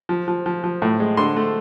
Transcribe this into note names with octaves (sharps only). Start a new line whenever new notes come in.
F3
F3
F3
F3
A2
G#3
D3 C6
A3